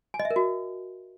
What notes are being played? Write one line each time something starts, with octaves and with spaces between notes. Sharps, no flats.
G#5
D#5
E5
A#4
F#4